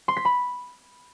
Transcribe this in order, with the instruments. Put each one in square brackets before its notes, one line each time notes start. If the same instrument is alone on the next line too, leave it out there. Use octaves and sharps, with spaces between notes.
[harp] C6
B6
B5